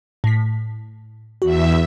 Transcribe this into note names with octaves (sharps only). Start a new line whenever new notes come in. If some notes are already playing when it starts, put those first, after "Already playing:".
A2 B6
E2 F#4 E5